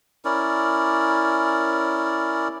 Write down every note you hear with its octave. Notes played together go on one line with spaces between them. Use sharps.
C#4 E4 A#4 D5